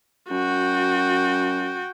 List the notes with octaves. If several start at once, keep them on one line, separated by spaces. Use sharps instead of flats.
F#2 F#4 G5